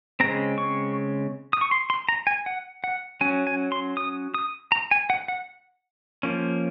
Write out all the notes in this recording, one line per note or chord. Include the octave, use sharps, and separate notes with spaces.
C#3 G#3 C4 A#5
C#6
D#6
C#6
C6
C6
A#5
G#5
F#5
F#5
F#3 C#4 G#5
G#5
C6
D#6
D#6
A#5
G#5
F#5
F#5
F3 A#3 C#4